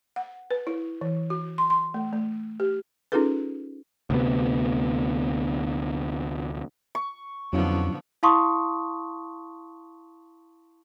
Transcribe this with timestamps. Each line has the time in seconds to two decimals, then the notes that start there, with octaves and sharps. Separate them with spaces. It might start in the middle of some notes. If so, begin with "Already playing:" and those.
0.16 F#5
0.51 B4
0.67 E4
1.01 E3
1.30 F#4
1.58 C6
1.70 C6
1.94 A3
2.13 A3
2.60 G4
3.12 C#4 D#4 F4 G#4 A4 B4
4.10 D2 C3 B3
6.95 C#6
7.53 F2 D3 F3 F#3 B3 C#4 E4
8.23 E4 F5 A5 C6 C#6 D#6